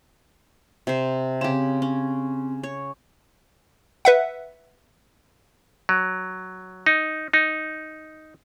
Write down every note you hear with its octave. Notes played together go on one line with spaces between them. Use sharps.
C3 C5
C#3 C4 G4
C#4
C#5
B4 E5 F#5
F#3
D#4
D#4